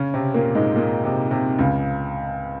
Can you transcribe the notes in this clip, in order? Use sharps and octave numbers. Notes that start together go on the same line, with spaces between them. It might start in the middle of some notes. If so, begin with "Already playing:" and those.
Already playing: C#3 C#4
C3 C4
A#2 A#3
G#2 G#3
A#2
C3
C3
C#2 C#3